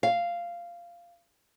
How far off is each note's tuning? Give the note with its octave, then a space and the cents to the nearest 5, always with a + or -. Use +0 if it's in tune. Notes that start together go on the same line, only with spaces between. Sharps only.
F5 -10